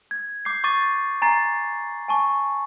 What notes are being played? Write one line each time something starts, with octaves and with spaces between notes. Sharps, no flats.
G#6
D6 G6 C7
C#6 D6 A6 D#7
G#5 A#5 A6 C7
G#5 A5 C#6